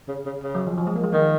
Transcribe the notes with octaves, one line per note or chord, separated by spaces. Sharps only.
C#3
C#3
C#3
F#3
F3
F3
G#3
A#3
G#3
D#3 A#3